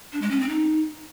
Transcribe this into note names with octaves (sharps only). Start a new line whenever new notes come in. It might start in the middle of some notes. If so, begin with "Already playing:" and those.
D4
G#3
C#4
C4
D#4